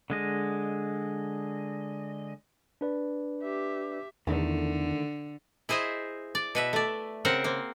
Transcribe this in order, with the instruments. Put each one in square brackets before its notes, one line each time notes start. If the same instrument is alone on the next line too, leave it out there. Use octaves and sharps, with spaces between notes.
[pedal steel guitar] D3 G#3 D#5
[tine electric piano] D4 B4 D5
[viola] G4 E5
[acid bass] E2 [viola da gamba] D3 [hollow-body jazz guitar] D#3 A3
[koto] E4 G#4 C5 D#5 E5
D5
B2 B4 E5
A3 D5
C#3 C4 A#4 C5 F#5
A#3 C4